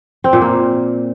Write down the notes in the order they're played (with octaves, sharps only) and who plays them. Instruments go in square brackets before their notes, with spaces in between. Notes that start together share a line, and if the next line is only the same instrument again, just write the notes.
[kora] C4
A#2
A#3